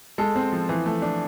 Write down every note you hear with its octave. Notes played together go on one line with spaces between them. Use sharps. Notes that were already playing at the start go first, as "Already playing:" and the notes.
G#3 A4
C4
F3
E3
A3
D4